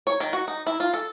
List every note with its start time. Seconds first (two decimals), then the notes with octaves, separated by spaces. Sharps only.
0.07 C#5
0.20 D#3
0.33 F#4
0.48 D#4
0.67 E4
0.80 F4
0.94 A4